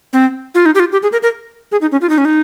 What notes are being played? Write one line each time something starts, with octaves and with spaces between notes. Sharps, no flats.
C4
F4
D#4
G4
F4
G4
G#4
A#4
A#4
G#4
D#4
C#4
F4
D#4
C#4
D#4